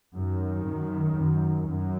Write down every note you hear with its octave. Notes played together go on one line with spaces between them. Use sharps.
F#2 D#3
F#2
F#2
F#2 F#3